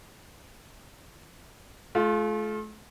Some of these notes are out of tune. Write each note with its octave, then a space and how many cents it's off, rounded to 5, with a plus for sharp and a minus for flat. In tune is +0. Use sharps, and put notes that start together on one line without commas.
A3 -45 F4 +0